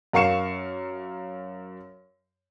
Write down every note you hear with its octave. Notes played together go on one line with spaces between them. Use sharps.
F#2 A#4 F5 C#6 C#7 E7